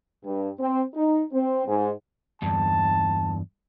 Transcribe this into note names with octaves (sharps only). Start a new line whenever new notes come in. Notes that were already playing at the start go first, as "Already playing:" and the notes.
G2
C4
D#4
C4
G#2
E2 G2 A5